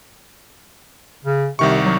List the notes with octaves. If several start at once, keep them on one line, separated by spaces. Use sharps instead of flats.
C#3
C2 C3 D#3 C#6
F#3